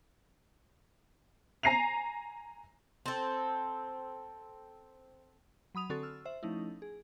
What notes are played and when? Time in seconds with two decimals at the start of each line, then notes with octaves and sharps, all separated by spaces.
1.63 G#5 A#5 A#6 C7 D#7 F7
3.06 C4 A4
5.75 F#3 B5 D#6 F7
5.90 D3 C4 F#4 A4 C#6 A6
6.03 E6 F6
6.25 C5 E5
6.43 F3 A3 C#4 D#4 E4
6.82 G#4